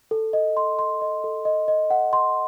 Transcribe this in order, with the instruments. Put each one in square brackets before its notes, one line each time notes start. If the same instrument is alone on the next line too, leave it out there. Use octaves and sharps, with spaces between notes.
[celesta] A4
D#5
C6
C6
D#5
A4
D#5
D#5
F#5
C6